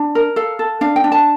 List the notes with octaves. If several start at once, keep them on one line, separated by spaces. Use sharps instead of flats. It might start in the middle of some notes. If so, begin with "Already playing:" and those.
Already playing: D4
A#4
A4 F5
A4
D4 F5
G5
D4
A5